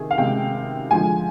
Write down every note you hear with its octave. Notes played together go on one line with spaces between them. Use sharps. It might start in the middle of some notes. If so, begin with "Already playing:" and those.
Already playing: C3 D#3 G#4
F5
C3 D#3 G#3 G5
D3 F3 G#3 G#5